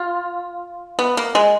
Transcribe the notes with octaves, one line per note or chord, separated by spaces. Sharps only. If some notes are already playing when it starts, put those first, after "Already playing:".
Already playing: F4
B3
A#3
G#3